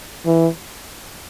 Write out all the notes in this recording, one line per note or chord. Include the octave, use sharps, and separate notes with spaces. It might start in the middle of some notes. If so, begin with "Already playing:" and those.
E3